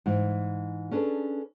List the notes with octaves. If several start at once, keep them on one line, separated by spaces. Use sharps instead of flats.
G#2 E3
C#4 D4 G#4 A4 B4